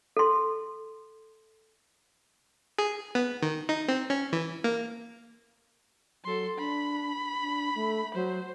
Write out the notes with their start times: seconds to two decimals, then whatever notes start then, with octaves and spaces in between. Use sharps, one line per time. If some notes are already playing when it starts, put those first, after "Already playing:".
0.17 A4 C6
2.79 G#4
3.15 B3
3.42 D#3
3.69 D#4
3.88 C4
4.10 C#4
4.33 E3
4.64 A#3
6.24 F#3 A4 C6
6.58 D4 B5
7.42 D4
7.75 A3
8.14 F#3 C5